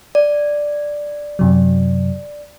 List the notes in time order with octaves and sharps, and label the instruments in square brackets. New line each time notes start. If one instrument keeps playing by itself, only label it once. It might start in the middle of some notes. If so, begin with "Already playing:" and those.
[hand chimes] D5
[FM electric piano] F#2 C3 F#3